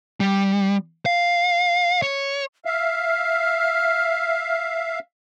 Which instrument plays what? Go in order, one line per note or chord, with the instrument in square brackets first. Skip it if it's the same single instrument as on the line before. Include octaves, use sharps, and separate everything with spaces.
[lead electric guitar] G3
F5
C#5
[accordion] E5 F5 [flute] F6